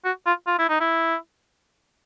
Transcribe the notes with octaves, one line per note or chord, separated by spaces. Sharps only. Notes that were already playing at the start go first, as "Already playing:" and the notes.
F#4
F4
F4
E4
D#4
E4